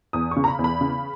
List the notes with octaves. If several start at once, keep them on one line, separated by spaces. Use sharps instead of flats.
E2 D#6
C#6
C#3
A#5
B5
E2
B5
C#3